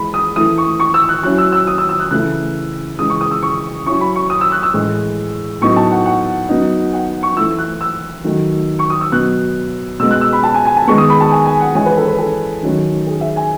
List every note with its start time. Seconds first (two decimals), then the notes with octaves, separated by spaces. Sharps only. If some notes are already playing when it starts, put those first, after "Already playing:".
Already playing: E3 G#3 B5
0.14 D#6
0.36 E3 A3 E4 D#6
0.58 C#6
0.80 C#6
0.94 E6
1.09 F#6
1.23 F#3 C#4 E4 F#6
1.38 E6
1.52 E6
1.67 D#6
1.78 E6
1.89 E6
2.00 F#6
2.11 C#3 E3 A3 E4 F#6
2.99 C#3 E3 G#3 D#6
3.10 C#6
3.21 D#6
3.31 E6
3.43 C#6
3.86 F#3 C#4 E4 C#6
4.01 B5
4.16 C#6
4.30 D#6
4.41 E6
4.52 F#6
4.63 E6
4.74 A2 E3 G#3
5.61 A2 F#3 B3 D#4 C#6
5.76 A5
5.91 F#5
6.06 F#5
6.49 F#3 B3 D#4
6.93 F#5
7.23 C#6
7.37 E3 A3 E4 E6
7.59 F#6
7.81 E6
8.24 D#3 F#3 A3
8.79 C#6
8.90 D#6
9.01 E6
9.12 B2 F#3 B3 F#6
9.99 B2 G#3 B3 E6
10.11 F#6
10.21 E6
10.33 B5
10.43 A5
10.54 G#5
10.65 G#5
10.77 A5
10.87 D#3 G#3 B3 C#6
10.98 D#6
11.10 B5
11.20 A5
11.31 G#5
11.46 G#5
11.60 F#5
11.75 E3 G#3 C#4 E4 G#5
11.86 B4
11.97 A4
12.08 B4
12.18 A4
12.63 D#3 F#3 A3 C#4
13.06 G#4
13.21 E5
13.36 G#5